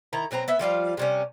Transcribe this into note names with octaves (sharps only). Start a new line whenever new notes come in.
D#3 E4 A#5
B2 F#3 C4 A#5
B3 E5
F3 G3 F4 F5
C3 G3 C#4